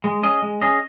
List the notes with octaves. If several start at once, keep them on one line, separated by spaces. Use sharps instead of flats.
G#3
C#4 G#4 D#5
G#3
C#4 G#4 D#5